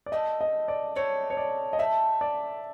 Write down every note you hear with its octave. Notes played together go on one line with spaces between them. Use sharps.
D5
A3 C4 E4 A4 D#5
D#5
D5
A3 C4 E4 A4 C#5
C#5
D5
D#5
A3 C4 E4 A4 E5
D5